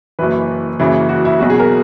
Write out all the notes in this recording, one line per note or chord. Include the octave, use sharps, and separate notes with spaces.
F#1 F#2 E3 B4
F#1 F#2 C#3 E3
F#4
E4
B1 B2 F#3 F#4
G#4
A#4